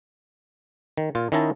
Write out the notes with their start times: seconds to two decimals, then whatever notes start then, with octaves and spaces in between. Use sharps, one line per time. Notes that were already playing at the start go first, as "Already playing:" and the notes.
0.98 D#3
1.15 A#2 F4
1.32 D#3 C#4 D#4 E4 D#5 A5